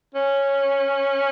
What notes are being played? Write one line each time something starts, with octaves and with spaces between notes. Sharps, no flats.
C#4